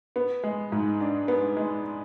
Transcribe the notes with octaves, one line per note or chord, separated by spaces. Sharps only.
B3
G#3
G#2
D4
B3
G#3